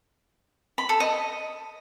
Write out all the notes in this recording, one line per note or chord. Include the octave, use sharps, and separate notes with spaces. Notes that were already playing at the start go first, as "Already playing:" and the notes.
B5
A4
D#5